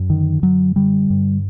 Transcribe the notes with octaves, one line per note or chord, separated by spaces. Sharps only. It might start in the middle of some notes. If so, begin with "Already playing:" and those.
Already playing: F#2
D3 D#3
F#2 F#3
D3 G3
G2